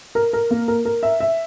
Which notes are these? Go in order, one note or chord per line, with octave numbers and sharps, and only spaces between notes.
A#4
A#4
A#3
A#4
A#4
E5
E5